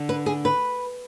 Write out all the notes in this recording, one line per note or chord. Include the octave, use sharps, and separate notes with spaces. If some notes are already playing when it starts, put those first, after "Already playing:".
Already playing: D3
B4
G#4
B4